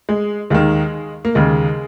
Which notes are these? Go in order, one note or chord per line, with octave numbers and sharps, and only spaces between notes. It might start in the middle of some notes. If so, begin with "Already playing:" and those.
G#3
D#2 D#3 G#3
A#3
D#2 C#3 G#3